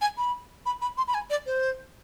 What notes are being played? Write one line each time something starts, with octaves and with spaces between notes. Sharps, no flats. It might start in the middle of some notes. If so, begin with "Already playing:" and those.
G#5
B5
B5
B5
C6
B5
G#5
D5
C5